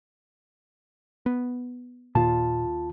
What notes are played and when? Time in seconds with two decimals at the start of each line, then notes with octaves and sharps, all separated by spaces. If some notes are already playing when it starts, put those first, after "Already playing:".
1.26 B3
2.15 D#2 A#2 F4 A5